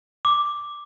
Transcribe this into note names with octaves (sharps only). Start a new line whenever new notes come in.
D6